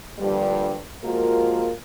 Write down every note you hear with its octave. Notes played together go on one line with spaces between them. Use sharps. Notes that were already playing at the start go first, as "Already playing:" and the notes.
G2 A#2 D3 F3 G3
F3 G#3 A#3 F4 F#4 A#4